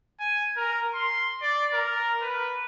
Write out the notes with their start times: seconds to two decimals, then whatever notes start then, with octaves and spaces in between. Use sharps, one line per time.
0.20 G#5
0.57 A#4
0.94 C6
1.42 D5
1.73 A#4
2.22 B4